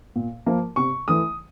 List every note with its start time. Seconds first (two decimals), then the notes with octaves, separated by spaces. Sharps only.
0.16 A#2
0.46 F3 A#3
0.76 C3 C#6
1.08 E3 A3 D#6